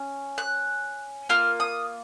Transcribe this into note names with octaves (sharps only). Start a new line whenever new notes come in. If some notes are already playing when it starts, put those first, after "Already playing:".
Already playing: C#4
F#6
A#3 F4 F6
D#6